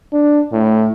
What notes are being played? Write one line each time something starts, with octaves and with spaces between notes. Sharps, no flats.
D4
A2